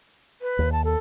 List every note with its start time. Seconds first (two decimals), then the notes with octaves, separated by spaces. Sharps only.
0.42 B4
0.59 D#2 D#3
0.72 A5
0.85 A4